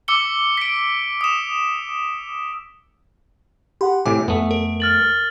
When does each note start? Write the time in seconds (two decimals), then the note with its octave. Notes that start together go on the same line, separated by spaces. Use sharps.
0.08 D6 E6 C#7 G7
0.57 B6 D7
1.21 D#6 E7
3.81 G4 F#5 B5 C6
4.06 A2 C3 G#5 D6
4.28 F2 A3 B3
4.51 A#4
4.80 F6 A6 F#7